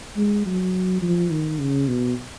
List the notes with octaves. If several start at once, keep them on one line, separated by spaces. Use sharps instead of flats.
G#3
F#3
F3
D#3
C#3
B2